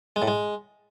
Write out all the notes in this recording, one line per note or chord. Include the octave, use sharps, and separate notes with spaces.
G#3
A2
G#3